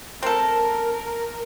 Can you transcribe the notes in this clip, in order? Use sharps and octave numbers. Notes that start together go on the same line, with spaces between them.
C4 A4 A#4